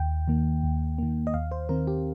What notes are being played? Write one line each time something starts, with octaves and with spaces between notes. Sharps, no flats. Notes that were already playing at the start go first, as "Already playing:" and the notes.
Already playing: D#2 G5
D#3 A#3
D#2
D#3 A#3
D#5
D#2 F5
C5
D#3 C4 A#4
G4